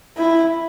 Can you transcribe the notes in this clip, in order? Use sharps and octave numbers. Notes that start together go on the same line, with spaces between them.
E4